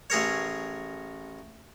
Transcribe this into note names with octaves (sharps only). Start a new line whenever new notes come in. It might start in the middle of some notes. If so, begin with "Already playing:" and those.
A1 G#4 A#4 C#5